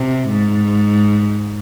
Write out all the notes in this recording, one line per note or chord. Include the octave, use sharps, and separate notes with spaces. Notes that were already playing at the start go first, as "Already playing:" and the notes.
Already playing: C3
G#2